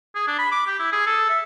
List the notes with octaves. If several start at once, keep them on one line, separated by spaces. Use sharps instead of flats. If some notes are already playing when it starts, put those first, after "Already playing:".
G#4
D4
B5
D6
G4
E4
G#4
A4
E5